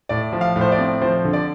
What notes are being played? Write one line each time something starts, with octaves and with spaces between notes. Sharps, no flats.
A2 D5
F3
F5
A2
C5
D5
C4
F3 C5
D3
D5